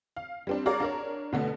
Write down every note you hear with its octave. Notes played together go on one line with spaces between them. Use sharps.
F5
G3 C4 D4
F#4 G#4 A#4 C#5 D5 F5
D4 A#4 C#5
B2 D3 A3 B3